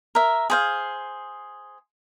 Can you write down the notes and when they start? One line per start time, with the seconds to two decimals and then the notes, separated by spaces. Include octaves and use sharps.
0.15 A#4 E5
0.50 G#4 C5 F5